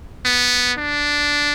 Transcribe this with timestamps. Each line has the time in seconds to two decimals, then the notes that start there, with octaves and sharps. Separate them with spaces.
0.25 B3
0.78 D4